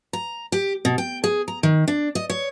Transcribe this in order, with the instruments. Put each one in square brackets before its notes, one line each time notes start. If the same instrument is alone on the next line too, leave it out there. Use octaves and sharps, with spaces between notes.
[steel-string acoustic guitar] A#5
G4
B2
G5
G#4
A#5
D#3
D4
D#5
C#5